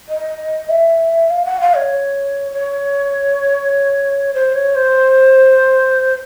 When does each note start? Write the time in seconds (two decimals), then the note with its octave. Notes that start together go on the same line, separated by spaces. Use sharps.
0.09 D#5
0.69 E5
1.30 F5
1.45 F#5
1.61 F5
1.76 C#5
2.52 C#5
4.34 C5
4.54 C#5
4.75 C5